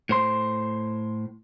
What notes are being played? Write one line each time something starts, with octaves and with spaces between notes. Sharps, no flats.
A2 C5 C6